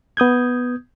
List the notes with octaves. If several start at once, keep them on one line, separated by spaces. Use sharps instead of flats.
B3 D#6 G6 G#6